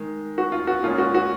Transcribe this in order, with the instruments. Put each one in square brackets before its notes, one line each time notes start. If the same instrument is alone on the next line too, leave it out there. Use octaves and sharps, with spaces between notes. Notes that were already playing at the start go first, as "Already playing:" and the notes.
Already playing: [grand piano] D#3 G#3
F#4
F4
F#4
A#2 G#3 C#4 F4
F#4
F#4